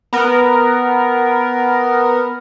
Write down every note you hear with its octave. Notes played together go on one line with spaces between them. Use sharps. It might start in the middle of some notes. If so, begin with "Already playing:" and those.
B3 A#4